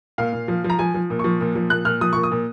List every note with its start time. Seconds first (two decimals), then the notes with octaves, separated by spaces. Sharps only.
0.18 A#2 F5
0.33 A#2
0.48 F3
0.64 F3
0.70 A#5
0.79 F3 G#5
0.94 F3
1.10 A#2
1.19 F3 C#6
1.41 A#2
1.55 F3
1.70 A#2 F#6
1.85 A#2 F6
2.01 F3 D#6
2.13 A#2 C#6
2.23 D#6
2.31 A#2